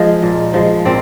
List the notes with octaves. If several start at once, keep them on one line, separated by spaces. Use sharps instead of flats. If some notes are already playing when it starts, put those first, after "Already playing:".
Already playing: F3 G#3 G#4
A#2
F3 G#3
A#2 C4